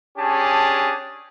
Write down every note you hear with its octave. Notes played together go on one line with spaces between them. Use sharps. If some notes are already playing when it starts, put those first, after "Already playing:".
C#4 D4 G4 G#4 G#5 A5